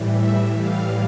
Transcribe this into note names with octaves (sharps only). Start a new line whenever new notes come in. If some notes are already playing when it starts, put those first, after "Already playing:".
Already playing: A2 E3 G3
E5
F5